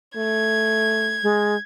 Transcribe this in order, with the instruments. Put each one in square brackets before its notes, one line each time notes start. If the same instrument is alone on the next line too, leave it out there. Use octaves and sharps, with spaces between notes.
[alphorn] A3 [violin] G#6
[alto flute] G#3